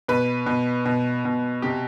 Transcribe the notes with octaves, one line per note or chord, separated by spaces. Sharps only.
B2 B4
B2
B2
B2
C3 G4